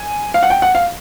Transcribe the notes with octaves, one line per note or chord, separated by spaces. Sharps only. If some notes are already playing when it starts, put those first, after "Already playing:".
Already playing: G#5
F5
F#5
G5
F#5
F5